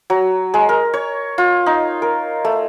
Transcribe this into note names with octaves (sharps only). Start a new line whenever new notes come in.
F#3
G#3
A#4
C#5
F4
D#4
A#4
A3